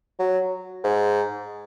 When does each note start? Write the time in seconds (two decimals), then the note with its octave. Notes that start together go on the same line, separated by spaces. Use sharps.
0.19 F#3
0.84 G#2